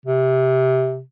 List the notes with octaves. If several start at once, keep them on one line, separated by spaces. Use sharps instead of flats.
C3